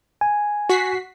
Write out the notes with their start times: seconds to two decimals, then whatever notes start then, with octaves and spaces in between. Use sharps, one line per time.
0.21 G#5
0.69 F#4 B6 C7